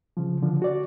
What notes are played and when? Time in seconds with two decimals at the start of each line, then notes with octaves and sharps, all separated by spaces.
0.17 C#3 F3
0.42 D3 F3
0.62 F#4 D5